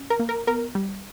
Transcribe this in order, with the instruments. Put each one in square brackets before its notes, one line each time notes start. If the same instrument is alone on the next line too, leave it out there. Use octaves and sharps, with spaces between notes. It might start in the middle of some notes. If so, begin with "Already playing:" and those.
Already playing: [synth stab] C#4
A#4
A#3
A#4
B3 A#4
G3